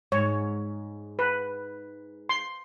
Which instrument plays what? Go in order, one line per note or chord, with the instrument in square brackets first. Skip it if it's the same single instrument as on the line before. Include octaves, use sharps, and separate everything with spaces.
[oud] G#2 [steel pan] C#5
[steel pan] B4
C6